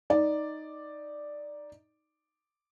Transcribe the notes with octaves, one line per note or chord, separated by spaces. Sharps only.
D#4 D5